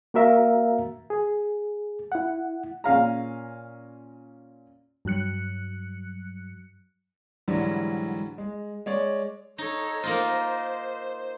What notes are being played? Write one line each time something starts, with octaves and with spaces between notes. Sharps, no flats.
A#3 F#4 A#4 E5 F5 A#5
G#4
E4 F#5
A#2 C#4 F5 A#5
G2 F#3 F#6 C#7
G#2 D3 E3 F#3 G3
G#3
G#3 C#5 D5
D#4 A4 C#5
A#3 D#4 F4 C5